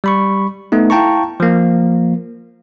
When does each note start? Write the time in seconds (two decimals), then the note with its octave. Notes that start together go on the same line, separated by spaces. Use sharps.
0.04 G3 B5 C#6
0.72 A3 B3 D#4
0.90 E4 F5 G5 A5 A#5 C#6
1.40 F3 A#3